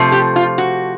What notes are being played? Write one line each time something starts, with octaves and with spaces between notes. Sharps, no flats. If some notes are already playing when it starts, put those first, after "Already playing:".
Already playing: C3 F3 A3
G4
F4
F#4